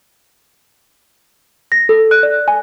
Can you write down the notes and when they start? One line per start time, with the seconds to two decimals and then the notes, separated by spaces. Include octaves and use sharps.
1.72 A#6
1.89 A4
2.11 F#6
2.23 D5
2.48 G#5